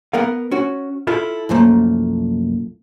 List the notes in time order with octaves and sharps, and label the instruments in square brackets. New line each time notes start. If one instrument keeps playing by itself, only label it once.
[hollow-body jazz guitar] B3 A#4 F5
C#4 F#4
E4 F4 A4
C2 F#2 F3 A3 A#3